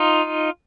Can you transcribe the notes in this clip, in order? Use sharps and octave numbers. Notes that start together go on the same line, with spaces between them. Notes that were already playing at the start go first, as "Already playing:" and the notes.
Already playing: D#4 F4